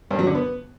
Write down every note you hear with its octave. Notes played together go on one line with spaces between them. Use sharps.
G2
F#3
D3
B3